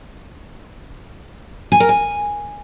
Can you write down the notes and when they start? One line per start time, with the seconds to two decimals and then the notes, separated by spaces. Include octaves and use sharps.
1.72 G#5
1.80 A#4
1.89 G#5